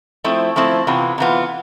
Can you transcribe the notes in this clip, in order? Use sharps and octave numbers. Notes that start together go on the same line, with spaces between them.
F3 A3 C4 E4
F3 A3 C4 E4
C3 E3 B3 F4
C3 E3 B3 F4